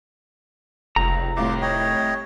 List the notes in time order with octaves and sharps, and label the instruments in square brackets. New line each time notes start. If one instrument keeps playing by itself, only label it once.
[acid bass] F1 [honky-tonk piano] C#2 [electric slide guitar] A#5
[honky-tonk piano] C2 A2 [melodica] F4 C6 D6
[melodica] C#5 D#5 G5